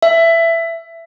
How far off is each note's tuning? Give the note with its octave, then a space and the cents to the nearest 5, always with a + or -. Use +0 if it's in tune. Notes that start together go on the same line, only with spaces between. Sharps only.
E5 +15